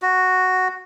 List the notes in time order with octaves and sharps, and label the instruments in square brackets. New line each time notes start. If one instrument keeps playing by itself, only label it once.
[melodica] F#4